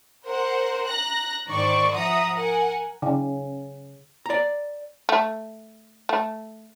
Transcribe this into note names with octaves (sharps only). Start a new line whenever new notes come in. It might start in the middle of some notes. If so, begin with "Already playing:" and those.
A#4 C5 F#5
A#5 F#6 A#6
G#2 D#3 D#4 C5 D5 C#6
F3 E5 F#5 A#5 D#6
A#4 F#5 G#5
C#3
D5 A#5
A3
A3